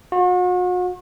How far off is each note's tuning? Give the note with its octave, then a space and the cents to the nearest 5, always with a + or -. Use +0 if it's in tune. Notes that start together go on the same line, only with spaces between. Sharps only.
F#4 -40